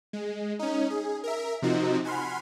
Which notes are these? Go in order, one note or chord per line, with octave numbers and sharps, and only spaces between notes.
G#3
C#4 D#4
G#4
A#4 E5
C3 F3 C4 D#4 F#4
F#5 G#5 B5 C6 F6